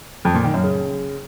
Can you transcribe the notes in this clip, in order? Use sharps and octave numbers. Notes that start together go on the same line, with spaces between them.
F2
A#2
D#3
F#2
C#3